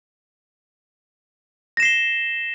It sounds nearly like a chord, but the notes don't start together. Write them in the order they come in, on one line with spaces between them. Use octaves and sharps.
A#6 E7 C7 G7